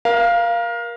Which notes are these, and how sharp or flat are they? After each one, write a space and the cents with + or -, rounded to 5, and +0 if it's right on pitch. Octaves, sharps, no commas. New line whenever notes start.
A#4 +25 F5 -10